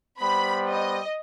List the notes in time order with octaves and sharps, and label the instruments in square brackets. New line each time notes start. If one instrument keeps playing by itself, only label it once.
[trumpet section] G3 B3 C5 [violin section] B5
[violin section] D#5